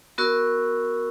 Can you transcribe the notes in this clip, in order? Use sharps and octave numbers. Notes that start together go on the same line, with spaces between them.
B3 F#4 A#4 C#6 E6